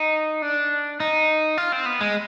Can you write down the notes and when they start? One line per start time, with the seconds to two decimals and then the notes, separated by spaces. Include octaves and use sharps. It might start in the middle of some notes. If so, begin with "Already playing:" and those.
Already playing: D#4
0.42 D4
1.00 D#4
1.58 F4
1.72 C4
1.86 B3
2.01 G#3